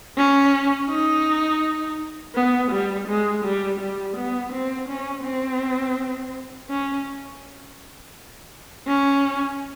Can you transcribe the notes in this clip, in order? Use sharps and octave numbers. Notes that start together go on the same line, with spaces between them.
C#4
D#4
B3
G3
G#3
G3
G3
B3
C4
C#4
C4
C#4
C#4